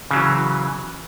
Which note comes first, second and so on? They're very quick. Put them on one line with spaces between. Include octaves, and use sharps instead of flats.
C#3 F#3 E3